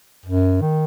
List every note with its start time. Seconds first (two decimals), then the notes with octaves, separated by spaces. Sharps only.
0.26 F#2
0.61 D#3